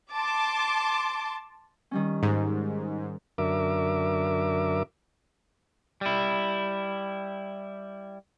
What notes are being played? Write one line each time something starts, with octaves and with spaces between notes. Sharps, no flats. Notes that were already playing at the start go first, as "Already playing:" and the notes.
A5 C6 D6
D#3 G3 C#4
G#2
F#2 D3 A#4 E5 D6
G3 E4